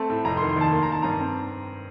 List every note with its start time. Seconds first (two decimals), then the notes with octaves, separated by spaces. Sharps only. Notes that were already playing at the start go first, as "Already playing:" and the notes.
Already playing: A3 C4 A5
0.10 A2
0.25 F1 A#5
0.37 C6
0.41 D#3
0.49 C6
0.56 D#2 A5
0.73 A#3 C6
0.83 A#5
0.88 D#3 A5
1.02 G2 A#5
1.19 C4